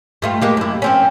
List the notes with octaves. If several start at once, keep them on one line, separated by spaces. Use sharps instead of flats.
G2 A3 F4
G#3 A#3 G4
F#2 E4
F3 C4 C#4